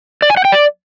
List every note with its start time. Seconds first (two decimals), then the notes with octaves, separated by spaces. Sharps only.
0.22 D5
0.30 G#5
0.37 F#5
0.45 G5
0.52 D5